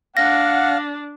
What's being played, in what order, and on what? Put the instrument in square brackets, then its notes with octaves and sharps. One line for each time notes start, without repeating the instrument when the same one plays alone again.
[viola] D4 [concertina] F5 [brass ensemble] F#5 [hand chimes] A#6